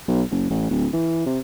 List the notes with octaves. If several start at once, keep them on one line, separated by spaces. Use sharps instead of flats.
B1
F#1
A1
D1
E3
C3